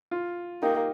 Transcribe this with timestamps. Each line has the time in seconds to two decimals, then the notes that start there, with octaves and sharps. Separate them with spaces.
0.11 F4
0.63 A#3 D#4 G4